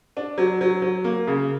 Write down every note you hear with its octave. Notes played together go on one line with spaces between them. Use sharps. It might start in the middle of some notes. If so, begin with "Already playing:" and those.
D4
F#3
F#3
F#3
A#3
C#3